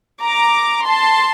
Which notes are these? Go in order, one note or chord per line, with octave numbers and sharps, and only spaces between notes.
A#5 D6
A5 C6